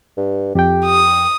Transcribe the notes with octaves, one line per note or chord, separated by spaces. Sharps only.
G2
F2 G4 G5
D#6